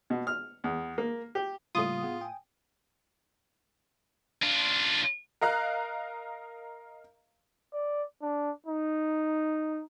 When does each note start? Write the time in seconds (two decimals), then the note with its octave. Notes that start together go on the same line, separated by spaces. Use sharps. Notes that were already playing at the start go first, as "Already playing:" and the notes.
0.10 B2
0.27 F6
0.64 E2
0.98 A#3
1.35 G4
1.75 A2 C#3 G3 A#3 F4 D#6
2.03 B3 G#4 F#5
2.21 G5 G#5
4.43 D4 F4
5.41 A#4 D#5 F5 A#5 F#6
7.73 D5
8.22 D4
8.66 D#4